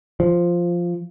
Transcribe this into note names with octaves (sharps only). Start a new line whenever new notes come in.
F3